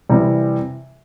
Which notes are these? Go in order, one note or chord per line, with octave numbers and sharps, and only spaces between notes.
C3 E3 G3